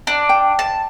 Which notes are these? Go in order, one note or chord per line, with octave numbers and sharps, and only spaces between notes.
D4
G5
A5